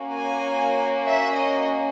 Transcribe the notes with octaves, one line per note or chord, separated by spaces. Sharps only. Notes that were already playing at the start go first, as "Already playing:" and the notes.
Already playing: A#3 C#4 F#4
G#5
E5
D#5